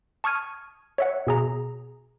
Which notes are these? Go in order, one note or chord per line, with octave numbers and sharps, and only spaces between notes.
A5 C#6 D#6 F6 G#6 D#7
C#5 E5 F#5
B2 G#4 A#5